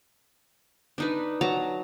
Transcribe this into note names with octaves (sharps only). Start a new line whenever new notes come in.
D4 D#4 B4
F#3 A5 A#5